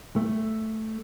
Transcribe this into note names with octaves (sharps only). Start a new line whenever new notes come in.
A3